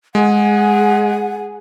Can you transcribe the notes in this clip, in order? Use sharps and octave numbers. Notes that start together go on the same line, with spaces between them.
G#3 G#4 F#5